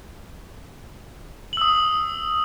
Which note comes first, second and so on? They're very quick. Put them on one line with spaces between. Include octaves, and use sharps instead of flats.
F#7 E6 D#6